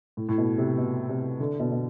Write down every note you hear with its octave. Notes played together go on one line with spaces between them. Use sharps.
A2
A2
B2
C3
B2
C3
D3
B2
B2